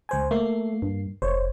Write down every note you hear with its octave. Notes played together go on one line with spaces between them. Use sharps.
C#2 C5 G#5
A3 A#3 C7
G2
F1 C5 C#5